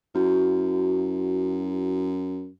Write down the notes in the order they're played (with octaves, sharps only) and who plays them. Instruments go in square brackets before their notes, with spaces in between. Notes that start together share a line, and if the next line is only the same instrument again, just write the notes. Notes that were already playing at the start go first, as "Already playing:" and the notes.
[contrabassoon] F#2 [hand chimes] E4 F#4